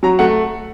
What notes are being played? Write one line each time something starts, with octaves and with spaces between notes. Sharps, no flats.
F#3 A#5
A3 F#5